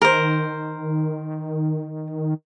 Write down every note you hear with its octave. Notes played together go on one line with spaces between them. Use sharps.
D#3 A#4 C5